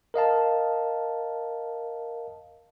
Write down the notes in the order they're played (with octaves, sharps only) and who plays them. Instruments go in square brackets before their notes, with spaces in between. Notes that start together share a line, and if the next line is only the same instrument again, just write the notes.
[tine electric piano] A#4 D#5 F5 A5